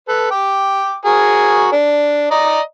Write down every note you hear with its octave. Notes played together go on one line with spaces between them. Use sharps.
A4 B4
G5 D6
F#4 G#4 A#4
D4
D5 D#5 A#5